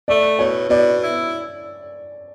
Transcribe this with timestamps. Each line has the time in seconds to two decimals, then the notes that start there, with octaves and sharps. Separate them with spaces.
0.08 A3 D5
0.39 B2 C#5
0.70 B2 D5
1.00 E4